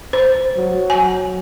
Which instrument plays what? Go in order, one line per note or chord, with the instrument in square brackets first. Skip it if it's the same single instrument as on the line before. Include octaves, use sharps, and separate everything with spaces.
[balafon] C5
[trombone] F#3
[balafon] G#5